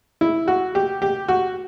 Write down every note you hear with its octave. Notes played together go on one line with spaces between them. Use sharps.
E4
F#4
G4
G4
F#4